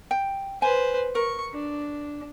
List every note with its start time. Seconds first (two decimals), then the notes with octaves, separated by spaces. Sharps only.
0.11 G5
0.62 B4 C5 G#5
1.15 A#4 C#6
1.54 D4